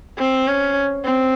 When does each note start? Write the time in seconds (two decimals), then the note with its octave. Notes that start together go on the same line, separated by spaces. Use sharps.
0.18 C4
0.47 C#4
1.05 C4